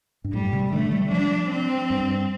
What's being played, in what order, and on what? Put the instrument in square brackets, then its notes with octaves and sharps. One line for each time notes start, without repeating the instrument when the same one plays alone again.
[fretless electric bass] G2
[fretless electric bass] A2 [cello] G3
[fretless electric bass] C3
[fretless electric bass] D3 [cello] A3
[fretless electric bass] G3
[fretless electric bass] F3 [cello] D4
[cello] C4
[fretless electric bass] G2